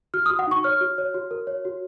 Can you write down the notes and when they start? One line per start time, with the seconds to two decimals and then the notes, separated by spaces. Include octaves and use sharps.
0.14 F#4 F6
0.26 F#4 D#6
0.39 F#5
0.47 D#4 C#6
0.64 C#5 F6
0.81 F#4
0.98 C#5
1.14 F#4
1.31 A#4
1.47 C#5
1.65 F#4